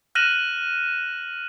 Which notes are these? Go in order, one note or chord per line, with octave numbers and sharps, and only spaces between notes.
F6 F#6 A#6 D#7 E7 F#7